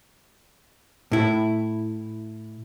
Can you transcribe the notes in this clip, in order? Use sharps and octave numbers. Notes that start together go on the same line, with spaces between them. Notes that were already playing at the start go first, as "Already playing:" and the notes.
A2 E4